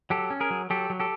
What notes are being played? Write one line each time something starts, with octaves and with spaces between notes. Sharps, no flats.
F#3 G4 A4
C#4
G#4 A#4
F#3
F#3 G4 A4
F#3
G4 A4